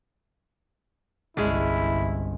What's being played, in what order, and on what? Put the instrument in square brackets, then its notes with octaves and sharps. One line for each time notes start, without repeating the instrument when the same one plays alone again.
[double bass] G1 C2 [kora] G#3 C#4 D4 [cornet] E4